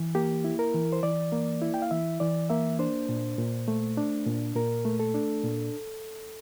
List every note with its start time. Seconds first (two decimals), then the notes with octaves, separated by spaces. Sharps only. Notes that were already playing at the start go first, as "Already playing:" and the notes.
Already playing: E3
0.15 A#3 G4
0.44 E4
0.59 A#4
0.74 E3
0.93 C5
1.03 E3 D5
1.32 A#3
1.62 E4
1.74 G5
1.82 F5
1.91 E3 E5
2.20 E3 D5
2.50 A#3 E5
2.79 D4 C5
3.09 A#2
3.38 A#2
3.68 A3
3.97 D4
4.27 A#2
4.55 A#2 A#4
4.85 A3
5.00 A4
5.14 D4
5.44 A#2